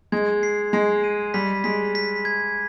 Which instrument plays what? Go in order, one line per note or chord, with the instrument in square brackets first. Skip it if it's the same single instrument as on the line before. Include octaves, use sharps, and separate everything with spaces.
[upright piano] G#3 [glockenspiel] G#6
[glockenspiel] C7
[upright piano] G#3 [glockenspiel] C7
[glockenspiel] D#7
[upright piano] G3 [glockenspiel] B6
[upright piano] G#3 [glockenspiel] B6
[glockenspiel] B6
G#6